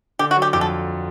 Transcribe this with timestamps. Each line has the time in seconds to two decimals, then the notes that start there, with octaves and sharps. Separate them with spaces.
0.19 D3 G4
0.31 F#4
0.37 F#3
0.42 G4
0.53 F2 G4
0.61 A4